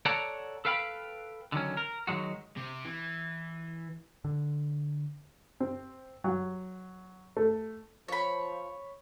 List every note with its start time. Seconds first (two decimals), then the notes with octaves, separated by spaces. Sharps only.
0.05 A4 C#5 D5 F#5 A5 A#5
0.65 A4 B4 F5 G5 A#5 B5
1.52 D3 D#3 F#3 C#4
1.77 A#4
2.07 D#3 F#3 G#3 F#4
2.57 C3
2.85 E3
4.25 D3
5.60 C4
6.24 F#3
7.37 A3
8.08 F3 C#5 B5